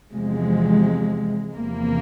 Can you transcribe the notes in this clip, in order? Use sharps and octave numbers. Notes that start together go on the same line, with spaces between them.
E2 C3 F3 G#3
E2 C3 F3 A#3